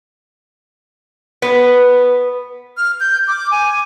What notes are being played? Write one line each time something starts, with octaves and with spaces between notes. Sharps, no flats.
B3 B4
F6
G6
D6
G#5